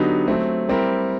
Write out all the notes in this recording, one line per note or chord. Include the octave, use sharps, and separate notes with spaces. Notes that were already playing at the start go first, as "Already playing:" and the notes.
Already playing: D3 F#3 B3 D#4 G4
F#3 A3 C4
G3 C4 E4 G4 A#4